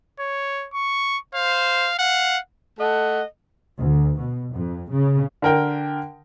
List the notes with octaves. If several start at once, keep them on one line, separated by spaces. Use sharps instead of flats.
C#5
C#6
C5 F5
F5 F#5
A3 A4 D#5 F#5
D2
B2
F2
C#3
D3 A#4 G5